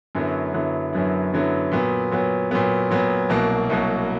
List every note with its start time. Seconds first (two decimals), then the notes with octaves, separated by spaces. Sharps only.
0.15 F#2 D3 F#3 B3 E4
0.54 F#2 D3 F#3 B3 E4
0.93 F#2 D3 F#3 B3 E4
1.33 F#2 D3 F#3 B3 E4
1.72 A#2 F#3 B3
2.11 A#2 F#3 B3
2.51 A#2 F#3 B3
2.91 A#2 F#3 B3
3.29 C2 B2 F#3 A#3
3.70 C2 B2 F#3 A#3